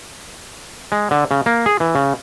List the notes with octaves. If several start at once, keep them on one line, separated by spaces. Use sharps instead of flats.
G#3
D3
C#3
A#3
G#4
E3
C#3